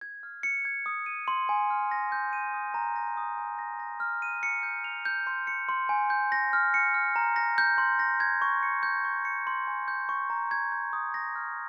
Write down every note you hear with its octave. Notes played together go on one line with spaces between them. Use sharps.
G#6
F6
C#7
G#6
D#6
D#7
C6
G#5
F6
A#6
G6
D#7
D#6
A#5
A#6
D#6
G#5
A#6
A#6
F6
D#7
C#7
G6
F7
G6
C6
C#7
C6
G#5
G6
A#6
F6
C#7
F6
A#5
A#6
G6
C6
A#6
G#6
C#6
C#7
G6
C#6
C#7
C6
G#5
G6
C#6
A#5
G#6
G6
D#6
A#6
F6